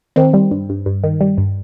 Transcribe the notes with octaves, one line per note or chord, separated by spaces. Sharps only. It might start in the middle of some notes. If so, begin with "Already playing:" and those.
D#3 C4
G3
G2
G2
G2
D#3
G3
G2